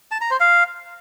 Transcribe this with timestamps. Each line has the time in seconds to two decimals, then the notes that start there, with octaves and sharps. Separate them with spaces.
0.11 A5
0.21 A#5
0.31 C5
0.40 F5